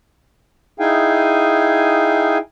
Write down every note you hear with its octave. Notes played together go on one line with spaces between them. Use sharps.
D#4 E4 G#4 F5 G5 G#5